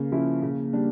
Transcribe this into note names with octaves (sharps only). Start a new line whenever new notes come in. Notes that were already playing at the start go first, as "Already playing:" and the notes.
Already playing: C#3 A#3
F3 C#4 E4
C#3
G3 D4